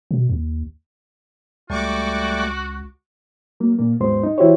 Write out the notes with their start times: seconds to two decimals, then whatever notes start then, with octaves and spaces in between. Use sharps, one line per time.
0.11 B2
0.30 D#2
1.70 C#2 G3 A3 F#4 C#6 D6
3.60 F#3 A#3
3.78 A#2 A#3
4.00 D#2 G#2 F#3 B3 C5 C6
4.23 D#4
4.38 E3 E4 F#4 G4 C5 C#5